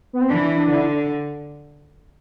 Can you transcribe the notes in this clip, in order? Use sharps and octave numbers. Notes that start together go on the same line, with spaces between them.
B3
C4
E3 D4
D4
D3 E4
D4